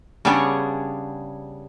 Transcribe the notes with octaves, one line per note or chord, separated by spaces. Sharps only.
C#3 G3 B3 D4 G#4 C#5